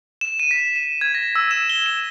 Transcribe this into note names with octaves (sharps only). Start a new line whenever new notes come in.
E7
D#7
B6
E7
G#6
A#6
E6
E7
G7
E7